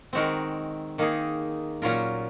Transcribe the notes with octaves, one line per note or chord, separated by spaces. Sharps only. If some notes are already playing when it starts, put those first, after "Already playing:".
D#3 G#3 C4 F#4 A#4
D#3 A#3 D#4 G#4
A#2 F#3 C#4 F4 A#4